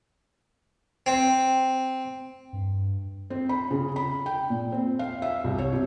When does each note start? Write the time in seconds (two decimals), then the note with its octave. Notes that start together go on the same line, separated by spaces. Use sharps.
1.06 C4
2.53 G2
3.30 C4
3.49 B5
3.71 C#3
3.96 B5
4.26 G5
4.50 A#2
4.72 C4
4.99 F5
5.22 E5
5.44 C2
5.58 C#5
5.73 C3